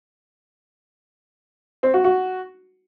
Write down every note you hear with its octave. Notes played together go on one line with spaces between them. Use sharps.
C4
F#4
F#4